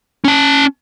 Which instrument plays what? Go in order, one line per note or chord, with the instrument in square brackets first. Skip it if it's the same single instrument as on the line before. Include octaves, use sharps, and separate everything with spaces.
[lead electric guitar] C#4 A5